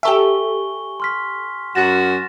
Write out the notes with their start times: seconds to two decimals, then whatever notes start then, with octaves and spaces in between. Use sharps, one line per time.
0.03 G4 A4 E5 G#5 C#6 G7
1.00 C6 F6 B6
1.75 F#2 F#4 A6 A#6 E7